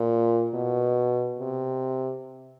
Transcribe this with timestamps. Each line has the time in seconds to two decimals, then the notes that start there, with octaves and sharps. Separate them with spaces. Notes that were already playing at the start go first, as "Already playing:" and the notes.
Already playing: A#2
0.54 B2
1.39 C3